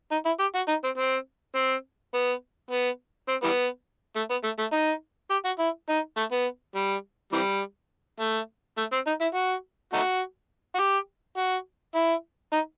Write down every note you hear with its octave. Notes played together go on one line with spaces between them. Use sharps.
D#4
E4
G4
F#4
D#4
C4
C4
C4
B3
B3
C4
E3 G3 B3
A3
B3
A3
A3
D#4
G4
F#4
E4
D#4
A3
B3
G3
C3 E3 G3
A3
A3
C4
D#4
E4
F#4
A3 D#4 F#4
F#4
G4
F#4
E4
D#4